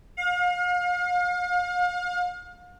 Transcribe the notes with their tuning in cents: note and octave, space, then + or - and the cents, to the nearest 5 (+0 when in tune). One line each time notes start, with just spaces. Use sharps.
F5 +40